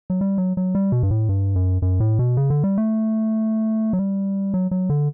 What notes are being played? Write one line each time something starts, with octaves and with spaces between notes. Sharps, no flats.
F#3
G3
F#3
F#3
G3
B2
G2
A2
G2
F#2
F#2
A2
B2
C#3
D3
G3
A3
F#3
G3
F#3
F#3
D3